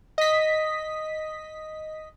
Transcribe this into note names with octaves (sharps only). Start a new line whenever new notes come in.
D#5 B6